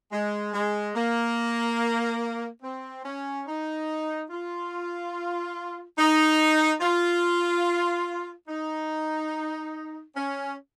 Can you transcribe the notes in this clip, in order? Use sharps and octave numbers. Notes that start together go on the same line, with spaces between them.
G#3
G#3
A#3
C4
C#4
D#4
F4
D#4
F4
D#4
C#4